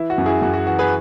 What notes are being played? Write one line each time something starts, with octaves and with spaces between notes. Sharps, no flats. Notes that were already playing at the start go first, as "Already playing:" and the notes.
Already playing: E3 E4
F#4
F#2
E4 G#4
F#2 F#4
F#4
E3 F#4
G#4 B4